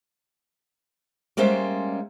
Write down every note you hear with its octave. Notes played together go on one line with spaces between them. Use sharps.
G3 G#3 A#3 C#4 C5 E5